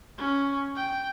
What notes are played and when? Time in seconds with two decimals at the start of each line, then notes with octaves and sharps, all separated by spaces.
0.18 C#4
0.76 G5